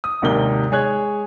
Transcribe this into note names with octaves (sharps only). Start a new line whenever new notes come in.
D#6
G#1 D#2 G#2 C3 A#4 G7
G#3 G#4 C#5 F#6 G#6